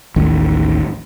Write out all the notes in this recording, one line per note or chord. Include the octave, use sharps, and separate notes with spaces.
A1 D#2 D#3